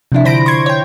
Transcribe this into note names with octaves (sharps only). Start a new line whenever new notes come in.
C3 F3 D4 E4
D3 C5 B5 A#6 D7
C6 C#6 G#6
C#5 G5